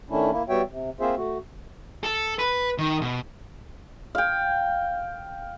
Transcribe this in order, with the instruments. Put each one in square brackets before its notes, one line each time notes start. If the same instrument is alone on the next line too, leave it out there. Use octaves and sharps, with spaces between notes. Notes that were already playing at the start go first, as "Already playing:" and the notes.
[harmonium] D#3 A3 C#4 D4 E4
A#3 E4
G3 B3 F#4 C#5 E5 G5
C3
A#3 C4 F4 G#4 C5 E5
A3 F#4
[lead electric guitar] A4
B4
D#3
B2
[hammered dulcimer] F5 G5